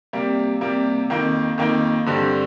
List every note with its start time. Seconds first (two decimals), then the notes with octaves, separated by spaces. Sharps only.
0.13 C3 G3 A#3
0.61 C3 G3 A#3
1.10 F2 D#3 A#3 D#4
1.58 F2 D#3 A#3 D#4
2.06 G2 D3 G3 C4